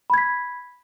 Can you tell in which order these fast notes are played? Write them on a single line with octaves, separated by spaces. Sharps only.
B5 G#6 B6